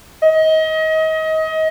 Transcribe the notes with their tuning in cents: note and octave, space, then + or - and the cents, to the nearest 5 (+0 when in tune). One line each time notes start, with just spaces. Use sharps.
D#5 +30